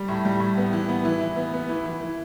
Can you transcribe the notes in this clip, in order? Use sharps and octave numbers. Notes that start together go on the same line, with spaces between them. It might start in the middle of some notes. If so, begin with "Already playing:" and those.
Already playing: G3
A2
G3
A2
B3
E3
B3
E3
E3
B3
B3
E3
E3
E3